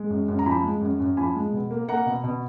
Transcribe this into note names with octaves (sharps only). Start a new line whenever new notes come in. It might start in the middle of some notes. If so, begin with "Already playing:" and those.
Already playing: G#3
F#2
F#2
A#5
F3 G#5 B5
G#3
F#2
F#2
F3 G#5 B5
G#3
B2
A#3
A#3 F#5 A#5
B2
B2